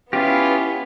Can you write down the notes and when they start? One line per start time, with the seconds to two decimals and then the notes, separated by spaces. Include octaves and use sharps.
0.13 B3 C#4 E4 F4 G4